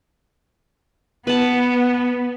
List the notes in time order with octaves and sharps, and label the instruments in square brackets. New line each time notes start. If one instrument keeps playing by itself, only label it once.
[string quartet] B3 [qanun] B4 A5